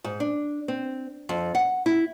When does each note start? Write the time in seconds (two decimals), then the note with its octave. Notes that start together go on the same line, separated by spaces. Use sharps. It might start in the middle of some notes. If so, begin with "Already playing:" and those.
0.04 G#2
0.20 D4
0.68 C4
1.29 F2
1.55 F#5
1.86 E4